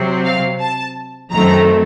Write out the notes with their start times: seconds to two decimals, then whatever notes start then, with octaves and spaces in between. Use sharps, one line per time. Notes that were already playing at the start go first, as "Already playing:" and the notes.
Already playing: C3 F#3 C4
0.24 F5
0.60 A5
1.31 F#2 D#3 A3 C4 A#5